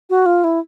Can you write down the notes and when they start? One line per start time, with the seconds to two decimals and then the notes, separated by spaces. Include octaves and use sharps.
0.10 F#4
0.26 F4
0.44 E4